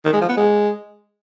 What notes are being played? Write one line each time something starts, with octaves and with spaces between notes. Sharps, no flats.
D#3
G#3
F3
B3
G#3